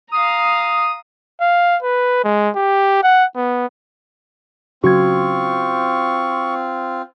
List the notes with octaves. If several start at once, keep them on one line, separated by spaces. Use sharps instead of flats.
F5 A#5 D#6
F5
B4
G#3
G4
F#5
B3
C#3 F#3 C4 F4 F#4 C#6 G#6